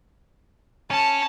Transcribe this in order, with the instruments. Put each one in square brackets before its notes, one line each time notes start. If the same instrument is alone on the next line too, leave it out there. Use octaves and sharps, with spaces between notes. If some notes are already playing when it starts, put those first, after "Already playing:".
[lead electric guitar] C#4 [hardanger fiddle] A5